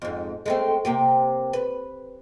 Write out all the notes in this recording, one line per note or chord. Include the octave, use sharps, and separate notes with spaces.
F2 G#2
G#3 A3 C4
C3 A#3 G4
B4